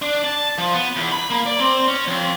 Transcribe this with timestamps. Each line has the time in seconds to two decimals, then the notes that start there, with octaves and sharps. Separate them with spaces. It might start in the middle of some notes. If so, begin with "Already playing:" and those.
0.02 D4
0.24 A5
0.58 F3
0.74 B3
0.96 E2
1.12 B5
1.30 A#3
1.46 D5
1.60 C4
1.88 C#4
2.08 F2